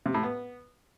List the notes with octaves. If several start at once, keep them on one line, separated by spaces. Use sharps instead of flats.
C3
A2
B3